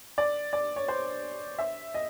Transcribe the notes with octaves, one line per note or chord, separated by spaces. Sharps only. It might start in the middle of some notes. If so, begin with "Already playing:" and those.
D5
D5
C#5
C5
E5
D#5